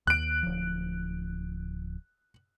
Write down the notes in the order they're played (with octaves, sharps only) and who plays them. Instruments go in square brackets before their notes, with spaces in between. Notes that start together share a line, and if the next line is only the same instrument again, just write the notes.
[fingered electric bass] D#2 [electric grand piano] F#6 D7
[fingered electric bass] D1 F3